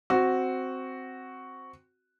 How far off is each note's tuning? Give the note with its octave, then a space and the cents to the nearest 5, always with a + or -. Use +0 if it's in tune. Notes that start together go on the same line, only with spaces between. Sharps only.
C4 +0 F#4 +0